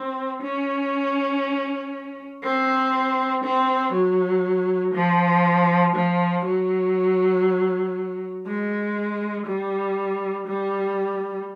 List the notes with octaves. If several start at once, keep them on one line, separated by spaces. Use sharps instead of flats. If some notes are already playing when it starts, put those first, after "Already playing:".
Already playing: C4
C#4
C4
C4
F#3
F3
F3
F#3
G#3
G3
G3